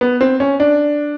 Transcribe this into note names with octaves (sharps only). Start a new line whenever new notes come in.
B3
C4
C#4
D4